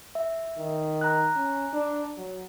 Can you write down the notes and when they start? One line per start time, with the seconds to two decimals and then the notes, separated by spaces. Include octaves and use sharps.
0.15 E5
0.58 D#3
1.01 A#5 F#6
1.36 C#4
1.73 D4
2.18 F#3